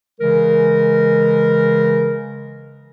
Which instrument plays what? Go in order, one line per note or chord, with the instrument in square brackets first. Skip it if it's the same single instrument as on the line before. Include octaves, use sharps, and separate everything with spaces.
[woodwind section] C#3 E3 G#3 A#4